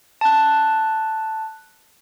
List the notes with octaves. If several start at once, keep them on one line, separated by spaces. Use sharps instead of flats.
A5 F#6